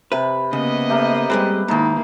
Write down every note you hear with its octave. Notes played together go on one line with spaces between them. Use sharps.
C3 B4 B5
C#3 A#3 B3 D#5
A3 G4 A#4
G3 G#3 C4 B4
G#2 D#3 A#3 D#4 E4 A5